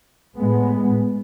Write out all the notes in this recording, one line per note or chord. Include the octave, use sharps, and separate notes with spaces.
A2 G#3 B3